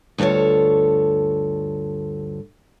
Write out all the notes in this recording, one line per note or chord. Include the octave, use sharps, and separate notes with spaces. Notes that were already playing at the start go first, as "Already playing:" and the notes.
D2 G2 F4 A4 C#5